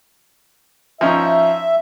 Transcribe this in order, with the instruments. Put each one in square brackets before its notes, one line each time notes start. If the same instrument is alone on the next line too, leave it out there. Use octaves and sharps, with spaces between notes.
[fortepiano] F3 C#4 D#4 [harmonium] E5